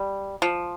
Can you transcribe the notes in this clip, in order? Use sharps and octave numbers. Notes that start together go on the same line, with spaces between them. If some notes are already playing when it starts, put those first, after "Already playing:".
Already playing: G3
F3